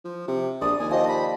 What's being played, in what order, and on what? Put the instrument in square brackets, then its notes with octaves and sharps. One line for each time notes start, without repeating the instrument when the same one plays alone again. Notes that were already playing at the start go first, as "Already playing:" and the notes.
[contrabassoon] F3
C3
[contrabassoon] A#1 [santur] D5 [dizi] D#6
[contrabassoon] D#2 [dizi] G#5
[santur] F3 G4 [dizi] D#5
[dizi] B5